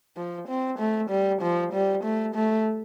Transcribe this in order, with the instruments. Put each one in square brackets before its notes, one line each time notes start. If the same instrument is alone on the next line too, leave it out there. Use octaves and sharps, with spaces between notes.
[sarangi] F3
C4
A3
G3
F3
G3
A3
A3